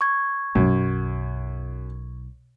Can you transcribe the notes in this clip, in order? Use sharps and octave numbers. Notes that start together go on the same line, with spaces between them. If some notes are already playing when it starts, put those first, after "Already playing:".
C#6 G#6
B1 F#2